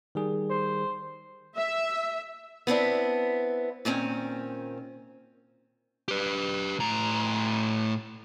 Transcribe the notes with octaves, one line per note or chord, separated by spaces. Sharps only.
D#3 G3 G#4
C5
E5
B3 C4 D4 E4
A#2 D#3 C4 C#4
G4 B4
A2 A#5